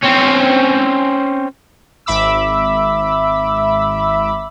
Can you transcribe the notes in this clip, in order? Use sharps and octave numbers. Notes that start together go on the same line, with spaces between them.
C4 C#4
G#1 E5 B5 D6 E6